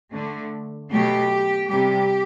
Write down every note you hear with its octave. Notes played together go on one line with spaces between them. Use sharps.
D3 A3
B2 F#3 A3 G4
C3 G3 G4